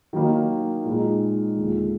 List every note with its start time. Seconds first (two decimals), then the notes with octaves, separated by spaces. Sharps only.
0.13 D#3 F#3 A#3 D#4
0.85 A#2 G#3 D#4
1.57 D#2 D3 F3 G#3